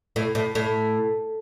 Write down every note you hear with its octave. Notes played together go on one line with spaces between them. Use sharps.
A2
A2
A2